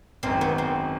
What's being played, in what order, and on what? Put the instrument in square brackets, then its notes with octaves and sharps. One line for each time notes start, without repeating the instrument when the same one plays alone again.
[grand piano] G#1 F#2 D#3 [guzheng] C4
[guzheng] B3
C4